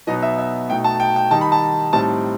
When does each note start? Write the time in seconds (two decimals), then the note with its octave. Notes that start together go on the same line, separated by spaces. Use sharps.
0.07 B2 F#3 B3 D#4 D#5
0.22 E5
0.38 E5
0.69 B2 A3 D#4 G5
0.84 A5
1.00 G5
1.16 G5
1.31 D#3 G3 D#4 A5
1.41 B5
1.52 A5
1.93 A2 G3 C4 D#4 A5